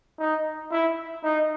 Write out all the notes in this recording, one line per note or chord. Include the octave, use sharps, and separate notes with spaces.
D#4
E4
D#4